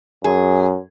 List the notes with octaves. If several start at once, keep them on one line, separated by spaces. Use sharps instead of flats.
F#2 G#4